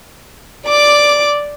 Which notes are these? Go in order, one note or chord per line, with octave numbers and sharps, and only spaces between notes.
D5 D6